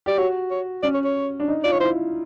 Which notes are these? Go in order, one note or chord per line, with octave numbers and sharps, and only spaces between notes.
G4 D5
F#4 C#5
C#5
C#4 D5
C#5
C#5
D4
D#4
F4 D5
C#5
E4 C5